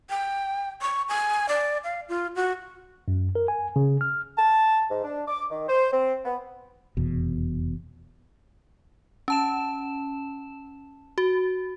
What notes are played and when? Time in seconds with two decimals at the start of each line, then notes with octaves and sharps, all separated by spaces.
0.10 G5
0.82 C#6
1.09 G#5
1.49 D5
1.84 F5
2.09 F4
2.36 F#4
3.08 F#2
3.35 A#4
3.48 G#5
3.76 C#3
4.01 F6
4.37 A5
4.89 G#2
5.04 D4
5.27 D6
5.50 D#3
5.68 C5
5.92 C4
6.25 B3
6.97 F1 E2 B2
9.28 C#4 A5 E7
11.18 F#4